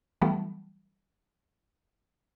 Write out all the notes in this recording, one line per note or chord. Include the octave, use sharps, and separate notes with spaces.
E3 F#3 G3 A3 B3